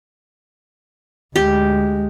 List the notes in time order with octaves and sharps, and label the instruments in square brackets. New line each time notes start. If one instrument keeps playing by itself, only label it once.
[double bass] D2 G#3 [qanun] G4